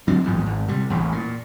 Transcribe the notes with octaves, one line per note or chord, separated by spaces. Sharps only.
D2 F#3 C4 D4
A1 E2 G#2 F3
G#1
C3 G3
E1 A1 E2
A#2